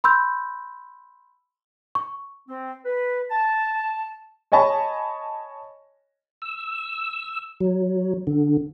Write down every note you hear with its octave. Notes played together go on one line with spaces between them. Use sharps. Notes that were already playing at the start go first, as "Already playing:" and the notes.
B5 C6 E6 G6
C#6
C4
B4
A5
C#5 D#5 G#5 A5 B5 C#6
E6
F#3
D3